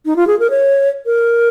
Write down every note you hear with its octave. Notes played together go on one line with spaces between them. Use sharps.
D#4
F4
G#4
A#4
C#5
A#4